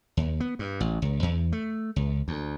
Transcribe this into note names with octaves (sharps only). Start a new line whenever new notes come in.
D#2
B3
G2
A1
C#2
E2
A3
C#2
D2